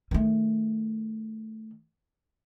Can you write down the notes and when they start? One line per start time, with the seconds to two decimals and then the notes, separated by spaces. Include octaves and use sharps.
0.11 D#3 A3